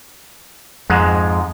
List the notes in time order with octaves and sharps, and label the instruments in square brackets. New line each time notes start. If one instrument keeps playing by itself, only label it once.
[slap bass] F2 [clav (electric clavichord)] G#2 G#3